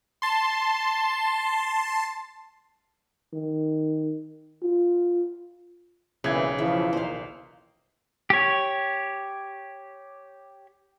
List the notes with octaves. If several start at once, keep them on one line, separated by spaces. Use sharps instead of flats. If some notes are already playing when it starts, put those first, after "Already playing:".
A5 C6
D#3
F4
B1 F2 A#2 C#3 E3 G#6
C#3 E3 F3 E5
D#2 A#2 C5 F5
G4 C#5